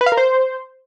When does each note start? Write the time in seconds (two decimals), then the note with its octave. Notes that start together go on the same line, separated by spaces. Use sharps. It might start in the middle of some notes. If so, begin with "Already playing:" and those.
0.01 B4
0.06 F5
0.12 A#4
0.17 C5